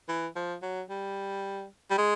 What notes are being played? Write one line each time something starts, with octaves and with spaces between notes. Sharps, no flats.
E3
F3
F#3
G3
G3
G#3